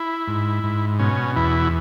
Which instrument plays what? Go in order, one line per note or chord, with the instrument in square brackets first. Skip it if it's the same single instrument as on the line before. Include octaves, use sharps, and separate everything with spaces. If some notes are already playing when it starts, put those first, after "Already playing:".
Already playing: [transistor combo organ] E4
G#2
G#2
B2 C#4
E2 E4